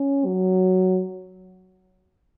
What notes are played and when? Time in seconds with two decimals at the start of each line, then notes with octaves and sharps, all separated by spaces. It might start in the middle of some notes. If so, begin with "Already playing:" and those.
Already playing: C#4
0.26 F#3